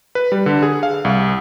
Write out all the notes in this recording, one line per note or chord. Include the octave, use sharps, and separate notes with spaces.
B4
G3
D3
G#4
F5
C2